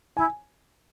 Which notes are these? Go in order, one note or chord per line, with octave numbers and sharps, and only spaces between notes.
E4 G#5